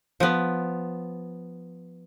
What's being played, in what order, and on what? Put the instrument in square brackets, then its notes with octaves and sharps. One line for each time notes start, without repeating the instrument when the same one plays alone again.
[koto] F3 B3